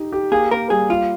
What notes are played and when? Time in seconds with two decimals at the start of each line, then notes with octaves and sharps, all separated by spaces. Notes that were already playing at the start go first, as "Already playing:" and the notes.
Already playing: D#4 G4
0.12 G4
0.32 A#3 G#4
0.51 A#3 A#4
0.70 G3 G#4
0.89 F4 G4